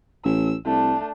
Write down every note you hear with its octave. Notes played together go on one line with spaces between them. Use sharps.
A1 E6
C2 A3 D4